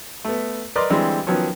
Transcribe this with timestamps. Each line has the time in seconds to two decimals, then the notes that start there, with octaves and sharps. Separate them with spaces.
0.25 A3 B3
0.76 A#4 B4 D5 D#5 C6 D6
0.90 D3 E3 G3 G#3 C4
1.27 D#3 F3 F#3 B3 C#4